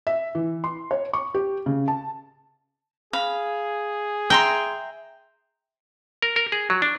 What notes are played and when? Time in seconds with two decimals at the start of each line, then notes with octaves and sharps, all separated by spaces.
0.07 E5
0.35 E3
0.64 C6
0.91 C#5
1.13 C#6
1.34 G4
1.66 C#3
1.88 A5
3.13 G#4 F5 B5
4.30 E5 G5 A#5 C6
6.22 A#4
6.36 A#4
6.52 G#4
6.70 F#3
6.82 D4